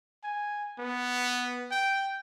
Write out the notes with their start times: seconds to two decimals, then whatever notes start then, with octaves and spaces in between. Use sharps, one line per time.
0.23 G#5
0.78 B3
1.71 G5